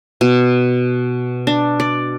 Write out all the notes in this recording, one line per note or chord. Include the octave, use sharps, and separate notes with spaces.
B2
D4
D5